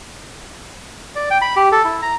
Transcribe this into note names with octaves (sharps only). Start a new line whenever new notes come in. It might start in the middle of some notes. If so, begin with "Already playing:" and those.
D5
G5
B5
G4
A4
E4
A#5